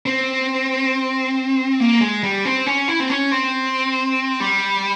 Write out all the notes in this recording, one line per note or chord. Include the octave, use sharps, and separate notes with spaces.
C4
A#3
G#3
G3
C4
C#4
E4
C4
C#4
C4
G3